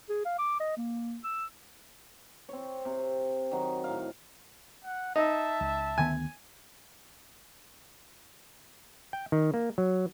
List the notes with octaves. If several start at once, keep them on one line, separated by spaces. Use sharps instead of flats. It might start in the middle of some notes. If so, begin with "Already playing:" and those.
G#4
F5
D6
D#5
A#3
E6
C4 C#5
C3
D#3 F#3
A2 F5
F#5
D#4 E5 A5
C#2
D2 D#3 B3 G#5
G5
D#3
A#3
F#3